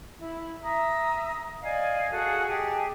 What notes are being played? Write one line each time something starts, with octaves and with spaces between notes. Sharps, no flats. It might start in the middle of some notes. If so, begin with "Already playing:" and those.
E4
E5 A#5 D#6
D5 D#5 F5 G#5
F#4 G#4 A4 F5
G4 G#4 D#5 A5